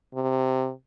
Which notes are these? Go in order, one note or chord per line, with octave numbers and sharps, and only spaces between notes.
C3